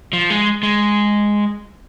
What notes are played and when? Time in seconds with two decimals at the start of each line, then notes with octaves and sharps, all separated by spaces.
0.13 F3
0.30 G#3
0.63 G#3